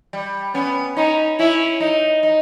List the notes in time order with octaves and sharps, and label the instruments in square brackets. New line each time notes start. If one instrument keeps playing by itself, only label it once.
[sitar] G3
[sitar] B3 [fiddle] C#4
[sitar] C#4 [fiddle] D#4
[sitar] C#4 [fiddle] E4
[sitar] D#4
D#4